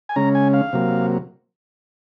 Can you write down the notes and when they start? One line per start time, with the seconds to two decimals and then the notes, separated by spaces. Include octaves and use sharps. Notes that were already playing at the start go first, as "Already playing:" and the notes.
0.09 G#5
0.16 C#3 G#3 C#4 A#5
0.35 G#5
0.54 F5
0.73 C3 F#3 A#3